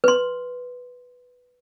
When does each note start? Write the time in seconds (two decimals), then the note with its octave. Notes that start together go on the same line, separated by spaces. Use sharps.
0.04 B4 C6